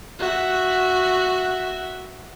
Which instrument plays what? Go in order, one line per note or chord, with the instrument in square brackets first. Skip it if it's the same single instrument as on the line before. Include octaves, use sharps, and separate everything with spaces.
[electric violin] F#4 E5